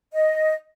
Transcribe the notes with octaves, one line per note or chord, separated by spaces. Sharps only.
D#5